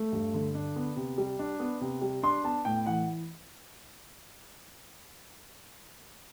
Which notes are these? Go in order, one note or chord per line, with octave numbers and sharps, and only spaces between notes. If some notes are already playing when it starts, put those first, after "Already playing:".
Already playing: A3
G2
D3
D4
B3
C3
G3
D4
B3
C3
G3
D4 C6
B3 A5
A2 G5
E3 F#5